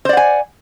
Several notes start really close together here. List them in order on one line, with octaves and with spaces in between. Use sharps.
C5 D5 F#5 G#5